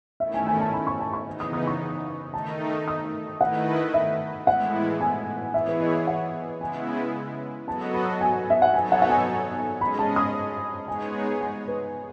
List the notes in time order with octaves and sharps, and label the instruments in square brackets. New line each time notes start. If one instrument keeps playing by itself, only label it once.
[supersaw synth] D#3 A3 C#4 E4 [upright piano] E5
[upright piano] G#5
G#5
A5
B5
C#6
A5
C#6
[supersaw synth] C#3 E3 B3 D#4
[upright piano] D#6
D#6
C#6
[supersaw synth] D#3 A3 D#4 [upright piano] A5
[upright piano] D#6
[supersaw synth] D#3 A3 E4 B4 D#5 [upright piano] F#5
[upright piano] E5
[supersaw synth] A2 E3 G#3 B3 E4 [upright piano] F#5
[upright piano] G#5
[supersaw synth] E3 B3 E4 G#4 C#5 [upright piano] E5
[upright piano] B4
D#5
F#5
[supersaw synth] C#3 G#3 B3 E4 [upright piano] G#5
[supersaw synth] F#3 B3 F#4 A4 D#5 [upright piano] A5
[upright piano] B5
G#5
E5
F#5
[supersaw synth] F#3 B3 D#4 A4 C#5 [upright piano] G#5
[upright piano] F#5
F#5
G#5
[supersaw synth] G#3 C#4 G#4 D#5 [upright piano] B5
[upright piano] A5
D#6
[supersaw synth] G#3 B3 D#4 G#4 C#5 [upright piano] G#5
[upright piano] G#5
B4